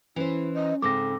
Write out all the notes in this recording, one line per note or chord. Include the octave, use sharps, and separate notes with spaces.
E3 C#4 E4 C5
D#5
G#2 C#3 C4 A4 D6 A#6